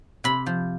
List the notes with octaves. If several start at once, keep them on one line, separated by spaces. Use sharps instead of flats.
C3 B5
F3